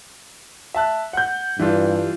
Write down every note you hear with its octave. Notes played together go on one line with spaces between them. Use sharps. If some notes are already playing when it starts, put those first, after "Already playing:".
E5 A5 F#6
F#5 G6
G2 E3 D4 F4